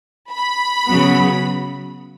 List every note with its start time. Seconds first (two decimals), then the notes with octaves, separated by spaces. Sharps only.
0.32 B5
0.87 C#3 F#3 B3